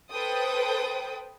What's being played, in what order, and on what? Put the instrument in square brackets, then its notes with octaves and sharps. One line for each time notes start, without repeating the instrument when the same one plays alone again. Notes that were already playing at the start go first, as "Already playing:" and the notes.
[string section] A4 B4 C5 G5 D#6